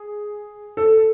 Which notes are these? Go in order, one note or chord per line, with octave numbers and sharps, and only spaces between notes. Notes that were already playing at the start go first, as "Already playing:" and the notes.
Already playing: G#4
A4